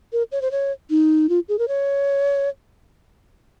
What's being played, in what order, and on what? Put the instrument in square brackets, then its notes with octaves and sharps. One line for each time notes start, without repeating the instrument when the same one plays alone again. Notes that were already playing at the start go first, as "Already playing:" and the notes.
[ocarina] A#4
C#5
C5
C#5
D#4
F4
G#4
A#4
C#5